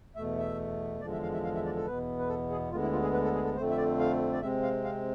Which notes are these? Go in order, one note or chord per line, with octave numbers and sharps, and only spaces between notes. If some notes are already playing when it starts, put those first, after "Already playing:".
E2 B2 A3 E5
E5
E2 D3 F3 G#3 D5
E5
F5
E5
F5
E5
D5
A4
E2 B2 B3 B4
B4
A4
G#4
D2 D3 G#3 B3 F4
E4
F4
G#4
B4
A4
G#4
A4
F2 D3 A3 C4 C5
E5
D5
F5
D5
C3 G#3 C4 E5
F5
F5